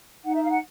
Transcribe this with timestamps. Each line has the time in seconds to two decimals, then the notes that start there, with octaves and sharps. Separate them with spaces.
0.24 D#4 F#5
0.35 E5
0.43 F5
0.50 F#5